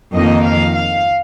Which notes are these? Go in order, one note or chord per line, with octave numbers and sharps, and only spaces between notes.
F2 D#3 A#3 D#4 D#5
F5
F5